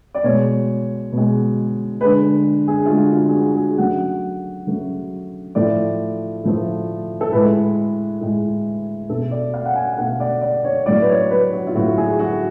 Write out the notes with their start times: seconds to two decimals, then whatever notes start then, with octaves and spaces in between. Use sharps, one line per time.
0.14 D5
0.24 B2 G#3 C#5
1.12 B2 G#3
2.01 D3 G#3 B4
2.68 G#4
2.86 F4
2.90 D3 G#3 F#4
3.12 F4
3.29 G#4
3.34 F#4
3.56 G#4
3.78 C#3 F#3 A3 F#5
4.67 C#3 F#3 A3
5.55 A2 F3 A3 D5
6.44 A2 F3 A3
7.21 A4
7.32 A2 G#3 B4
8.21 A2 G#3
9.09 B2 A3 A4
9.31 D5
9.54 F5
9.66 F#5
9.75 G#5
9.93 F5
9.98 B2 A3 F#5
10.20 D5
10.42 D5
10.64 C#5
10.86 A2 F#3 A3 D5
11.01 B4
11.09 C#5
11.31 B4
11.53 F#4
11.67 F4
11.75 A2 F#3 A3 F#4
11.97 G#4
12.19 F#4